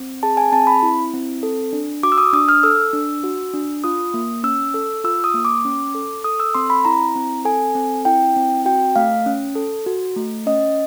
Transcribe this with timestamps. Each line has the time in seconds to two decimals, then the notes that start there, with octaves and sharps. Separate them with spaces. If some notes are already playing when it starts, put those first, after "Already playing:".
Already playing: C4
0.23 G#4 A5
0.37 G#5
0.52 C4 A5
0.67 B5
0.83 E4
1.13 C4
1.43 A4
1.73 D4
2.03 F#4 D6
2.12 E6
2.18 D#6
2.33 D4 D#6
2.49 F6
2.63 A4 E6
2.93 D4
3.23 F#4
3.54 D4
3.84 F4 D#6
4.14 A#3
4.43 C#4 E6
4.74 A4
5.04 F4 E6
5.24 D#6
5.34 A#3
5.45 D6
5.65 C#4
5.95 A4
6.24 A4 D#6
6.40 E6
6.54 C4 C6
6.70 B5
6.85 E4 A#5
7.16 C4
7.45 A4 G#5
7.75 C4
8.05 E4 G5
8.36 C4
8.66 F#4 G5
8.96 A3 F5
9.26 C#4
9.56 A4
9.86 F#4
10.16 A3
10.47 C#4 D#5